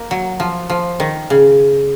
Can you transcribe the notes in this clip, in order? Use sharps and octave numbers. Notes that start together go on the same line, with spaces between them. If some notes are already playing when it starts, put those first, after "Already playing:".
Already playing: A#3
F#3
F3
F3
D#3
C#3